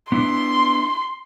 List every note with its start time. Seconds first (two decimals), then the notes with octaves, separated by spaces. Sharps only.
0.12 B3 D4 E4 C6